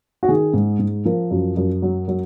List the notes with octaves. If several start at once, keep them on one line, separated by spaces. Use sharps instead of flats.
F#4
D#3 G#4
G#2
G#2
F3 A#4
F#2
F#2
F#3
F#3